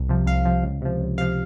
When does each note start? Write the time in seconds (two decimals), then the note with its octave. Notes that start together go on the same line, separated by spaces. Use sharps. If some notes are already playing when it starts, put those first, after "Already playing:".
Already playing: C2
0.09 C3 F3
0.26 C2 F5
0.45 C3 F3
0.63 C#2
0.81 C3 F3
1.00 C#2
1.18 C3 F5
1.21 F3